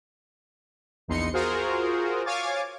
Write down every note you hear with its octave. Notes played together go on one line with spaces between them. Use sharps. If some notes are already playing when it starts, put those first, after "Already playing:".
A#1 E2 D#4 C6 C#7
F4 F#4 G#4 A#4 C5
C#5 F5 G#5 D6 A6